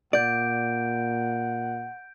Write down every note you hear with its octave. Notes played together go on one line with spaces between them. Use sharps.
A#2 D5 F#5 G6 D7